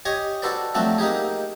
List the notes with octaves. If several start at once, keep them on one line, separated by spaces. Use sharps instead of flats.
G4 C#5 D#5 G#5 D#6
D4 F#4 A4 B4 C5 D5
F3 F#3 A3 C4 D4 F#4
A#3 D#4 G4 G#4